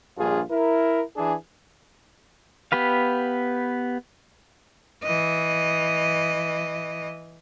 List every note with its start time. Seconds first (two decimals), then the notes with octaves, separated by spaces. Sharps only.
0.18 A#1 G2 F4 G#4
0.52 E4 A#4
1.17 E3 D4 G#4
2.72 B3 G4 B4 F5
5.04 E3 D#5